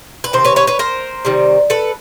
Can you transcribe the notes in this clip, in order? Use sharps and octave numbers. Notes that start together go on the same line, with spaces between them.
B4
C3 D#3 C5
B4 C#5
B4 C#5
B4 C#5
A#4 C5
C3 D#3 G3
A4 B4